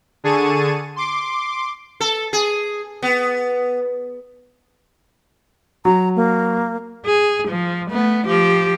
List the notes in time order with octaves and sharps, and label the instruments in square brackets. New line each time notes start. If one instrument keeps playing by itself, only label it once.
[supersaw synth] D3 G#4 A5 C#6 D#7
C6 D6
[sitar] A4
G#4
B3
[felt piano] F#3 [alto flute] A#5
[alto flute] A#3
[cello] G#4
F3
A3 B3
F3 G4